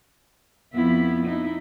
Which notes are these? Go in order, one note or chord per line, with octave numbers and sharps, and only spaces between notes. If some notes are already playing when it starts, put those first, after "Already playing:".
F2 B3 E4
D#4 E4